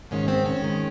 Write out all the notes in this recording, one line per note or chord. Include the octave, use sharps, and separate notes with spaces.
G#2 D#3 G#3 C#4
C4
C#4
D#3 G#3